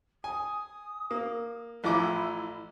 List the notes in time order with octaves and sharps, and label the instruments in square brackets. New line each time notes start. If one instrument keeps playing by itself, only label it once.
[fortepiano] G#5 [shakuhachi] D#6
[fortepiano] A#3
[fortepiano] A1 F3 D6 [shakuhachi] E4